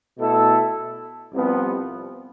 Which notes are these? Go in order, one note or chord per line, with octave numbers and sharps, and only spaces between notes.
B2 A3 E4 A4
C2 C3 F3 B3